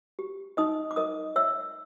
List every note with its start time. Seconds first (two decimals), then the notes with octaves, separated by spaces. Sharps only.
0.19 G4
0.57 D#4 D#5 D#6
0.91 D6
0.96 A#4 D#5 D#6
1.36 C#5 E5 E6